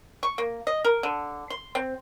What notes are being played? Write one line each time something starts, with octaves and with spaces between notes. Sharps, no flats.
C#6
A#3
D#5
A#4
D3
C6
C4